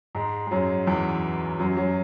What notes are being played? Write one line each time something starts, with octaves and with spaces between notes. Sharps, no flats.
G#2 G#3
G#3
F#2 F#3
E2 E3
F#2 F#3
F#2 F#3